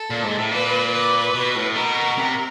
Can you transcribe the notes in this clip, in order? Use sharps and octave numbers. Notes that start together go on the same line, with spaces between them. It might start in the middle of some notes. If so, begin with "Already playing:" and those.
Already playing: A4
A#2
G#2
A2
A#2 B4
B4
B2
A2
B2 A#4
C3